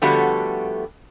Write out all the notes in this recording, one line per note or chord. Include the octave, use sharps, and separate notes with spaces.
D3 F3 G3 A3 B3 F#4